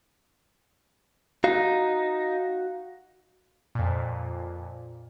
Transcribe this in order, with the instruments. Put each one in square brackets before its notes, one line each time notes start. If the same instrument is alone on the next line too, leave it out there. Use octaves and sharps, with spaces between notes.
[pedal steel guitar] D#4 [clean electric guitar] F#4 F5
[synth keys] F2 A#2